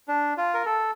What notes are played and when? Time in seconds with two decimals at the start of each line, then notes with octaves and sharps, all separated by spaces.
0.08 D4
0.37 F4
0.54 A#4
0.65 A4